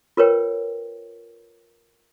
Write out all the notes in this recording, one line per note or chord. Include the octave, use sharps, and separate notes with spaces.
F4 A#4 B4 C#5 G5